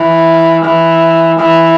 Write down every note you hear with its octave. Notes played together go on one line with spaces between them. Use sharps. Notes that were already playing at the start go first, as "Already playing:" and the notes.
Already playing: E3
E3
E3